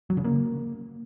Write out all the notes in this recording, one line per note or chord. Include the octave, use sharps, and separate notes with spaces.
F#3
C#3
A#3